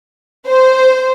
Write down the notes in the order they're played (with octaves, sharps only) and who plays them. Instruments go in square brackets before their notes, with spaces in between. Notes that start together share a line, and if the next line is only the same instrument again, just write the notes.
[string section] C5